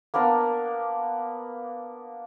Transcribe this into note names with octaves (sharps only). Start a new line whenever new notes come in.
A#3 B3 D4 A#4